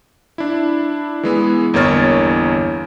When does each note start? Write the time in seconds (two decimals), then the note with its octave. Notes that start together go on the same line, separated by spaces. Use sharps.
0.38 D4 E4
1.23 E3 G#3 B3
1.74 G1 E2 A#3 C#5 F6 A6